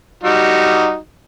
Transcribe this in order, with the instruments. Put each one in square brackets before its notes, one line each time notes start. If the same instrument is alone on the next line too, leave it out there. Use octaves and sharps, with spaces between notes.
[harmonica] G3 D#4 F#4